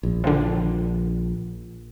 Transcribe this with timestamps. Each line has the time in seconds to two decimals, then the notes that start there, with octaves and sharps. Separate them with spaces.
0.03 A#1
0.24 D3 D#3 F3